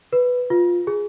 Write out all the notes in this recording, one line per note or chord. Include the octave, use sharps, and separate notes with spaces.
B4
F4
G#4